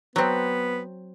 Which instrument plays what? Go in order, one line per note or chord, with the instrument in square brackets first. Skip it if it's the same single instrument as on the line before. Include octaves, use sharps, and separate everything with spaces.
[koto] F#3 C4 [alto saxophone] B3